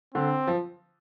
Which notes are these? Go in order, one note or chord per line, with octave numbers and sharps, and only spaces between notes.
D3 C4
F3